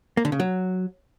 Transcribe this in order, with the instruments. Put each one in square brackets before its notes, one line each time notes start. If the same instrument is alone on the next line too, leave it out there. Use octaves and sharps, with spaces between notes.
[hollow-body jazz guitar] A#3
D3
C#3
F#3